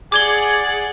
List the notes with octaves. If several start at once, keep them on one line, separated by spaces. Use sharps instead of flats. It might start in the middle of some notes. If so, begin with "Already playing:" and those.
G#4 D5 F#5 D6 G#6 G7